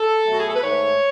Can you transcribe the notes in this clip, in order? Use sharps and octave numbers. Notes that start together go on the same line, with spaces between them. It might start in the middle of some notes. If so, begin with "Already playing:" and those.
Already playing: A4
B2 F#3 A3
F#4
G#4
A4
B4
G#2 D#3 A3 C#5